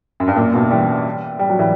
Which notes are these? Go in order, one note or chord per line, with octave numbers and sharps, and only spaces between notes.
F#2
G2
F#2 A#2
G2 B2
E3 G3
G3
F#3
E3 G3